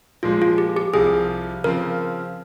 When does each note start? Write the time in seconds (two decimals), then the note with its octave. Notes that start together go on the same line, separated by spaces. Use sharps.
0.23 A#2 F3 G#3 F4
0.42 F4
0.58 G4
0.77 G4
0.93 C2 C3 F3 G#4
1.64 C#3 F3 C4 A#4